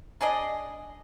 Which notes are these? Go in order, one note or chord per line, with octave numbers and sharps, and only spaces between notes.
D4 G#4 D5 D#5